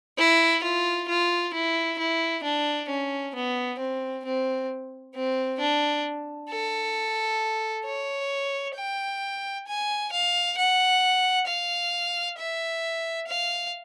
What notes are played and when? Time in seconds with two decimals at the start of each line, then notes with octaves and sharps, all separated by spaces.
0.18 E4
0.63 F4
1.08 F4
1.54 E4
1.98 E4
2.43 D4
2.89 C#4
3.35 B3
3.79 C4
4.25 C4
5.15 C4
5.59 D4
6.50 A4
7.85 C#5
8.76 G5
9.67 G#5
10.12 F5
10.57 F#5
11.47 F5
12.38 E5
13.27 F5